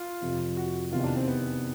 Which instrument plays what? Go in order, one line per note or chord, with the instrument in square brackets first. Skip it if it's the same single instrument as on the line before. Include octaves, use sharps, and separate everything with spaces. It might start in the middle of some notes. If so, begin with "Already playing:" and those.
Already playing: [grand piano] F4
[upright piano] F2 C3 F3
[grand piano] F#4
[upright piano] E2 C3 D#3 [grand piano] F4
[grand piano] D4
C4
B3